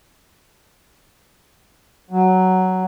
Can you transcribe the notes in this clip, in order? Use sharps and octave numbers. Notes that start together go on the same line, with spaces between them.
F#3